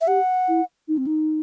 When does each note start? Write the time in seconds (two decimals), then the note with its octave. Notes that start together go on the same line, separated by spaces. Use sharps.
0.01 E5
0.07 G4 F#5
0.48 E4
0.88 D#4
0.97 C4
1.06 D#4